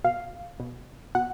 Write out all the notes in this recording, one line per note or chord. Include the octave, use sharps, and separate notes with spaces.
B2 F5
B2
B2 F#5